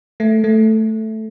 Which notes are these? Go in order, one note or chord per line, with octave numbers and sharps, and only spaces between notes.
A3
A3